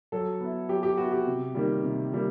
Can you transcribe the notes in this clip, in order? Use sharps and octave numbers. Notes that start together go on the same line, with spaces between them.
F#3 A4
B3 E4
F#3 G4
G4
B3 E4 F#4
G4
C3
D#3 G3 A#3
C3
D#3 G3 A#3